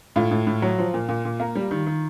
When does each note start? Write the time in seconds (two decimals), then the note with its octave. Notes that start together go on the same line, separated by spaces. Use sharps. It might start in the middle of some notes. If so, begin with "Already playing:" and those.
0.16 A2 F4
0.31 A2
0.47 A2
0.62 F#3
0.78 F3
0.94 A#2
1.09 A#2
1.25 A#2
1.40 A#3
1.55 G3
1.71 D#3
1.86 D#3